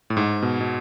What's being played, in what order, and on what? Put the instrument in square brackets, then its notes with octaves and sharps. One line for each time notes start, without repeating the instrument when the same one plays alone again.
[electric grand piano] A2
G#2
B2
B2